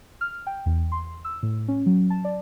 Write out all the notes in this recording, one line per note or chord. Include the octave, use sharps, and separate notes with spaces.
F6
G5
E2
C6
E6
A2
C#4
F#3
A5
D5